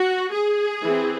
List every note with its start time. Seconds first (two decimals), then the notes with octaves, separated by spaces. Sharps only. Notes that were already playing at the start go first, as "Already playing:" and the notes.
Already playing: F#4
0.33 G#4
0.84 E3 C4